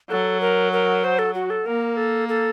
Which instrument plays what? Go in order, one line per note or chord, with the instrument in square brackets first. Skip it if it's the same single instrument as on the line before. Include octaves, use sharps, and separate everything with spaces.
[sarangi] F#3 [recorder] A4
[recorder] A#4
A#4
C5
A4
F#4
A4
[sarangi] A#3 [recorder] A#4
[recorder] A4
A4